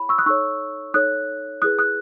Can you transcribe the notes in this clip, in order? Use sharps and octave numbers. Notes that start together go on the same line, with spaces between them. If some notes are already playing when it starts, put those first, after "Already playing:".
Already playing: E4 G#4 C#5 B5
C#6 E6
D#6 F#6
D#4 A4 C#5 C#6 E6
D#4 A4 C#5 D#6 F#6
E4 G#4 B4 D#6 F#6
D#6 F#6